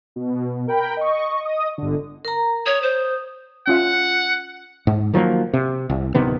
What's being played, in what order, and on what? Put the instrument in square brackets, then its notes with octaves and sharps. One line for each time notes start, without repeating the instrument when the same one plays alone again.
[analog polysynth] B2
A#4 G5 B5
D#5 C#6
D#5 D#6
G1 D3
[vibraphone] A#4 A#5
[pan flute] C#5 [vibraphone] D#6
[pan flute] C5
[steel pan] C#4 F4 E5 [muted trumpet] F#5
[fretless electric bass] G#2
D#3 F3 F#3 A#3
C3
C2
D1 C3 D#3 B3